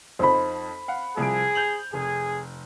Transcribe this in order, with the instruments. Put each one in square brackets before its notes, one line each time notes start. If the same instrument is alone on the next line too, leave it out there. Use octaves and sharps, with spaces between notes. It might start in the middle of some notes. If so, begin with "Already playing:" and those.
[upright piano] F2 F3 D#4 [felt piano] C5 B5
[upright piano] F5 F#5
[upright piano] C2 F3 D7 [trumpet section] G#4
[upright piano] G6 F7 F#7
[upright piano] F1 [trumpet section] G#4